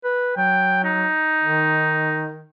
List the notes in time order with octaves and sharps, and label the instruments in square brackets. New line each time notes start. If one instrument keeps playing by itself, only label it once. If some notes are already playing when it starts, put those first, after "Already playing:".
[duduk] B4
[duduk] F#3 [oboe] G5
[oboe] D#4
[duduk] D#3